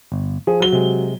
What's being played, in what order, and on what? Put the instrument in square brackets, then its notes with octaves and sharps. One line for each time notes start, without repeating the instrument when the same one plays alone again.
[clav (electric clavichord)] G1
[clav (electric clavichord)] F3 [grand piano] G#4
[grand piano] F#3 G7
[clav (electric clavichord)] C3 G#3